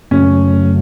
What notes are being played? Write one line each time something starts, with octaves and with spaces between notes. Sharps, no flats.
F#2 C#3 F#3 A3 C#4